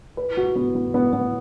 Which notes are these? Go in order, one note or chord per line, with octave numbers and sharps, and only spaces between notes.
B4
F#4
B3
B3
B3
B3